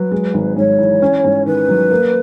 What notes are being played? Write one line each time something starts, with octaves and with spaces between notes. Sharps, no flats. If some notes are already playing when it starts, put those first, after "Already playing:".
Already playing: F#3 B4
G#3
G#1
G#2 C#5
E3
C#4
G#2
D#3 B4
F#3
A#3